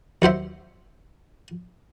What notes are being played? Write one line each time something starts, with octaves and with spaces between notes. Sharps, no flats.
D#2 F#3 C5 E5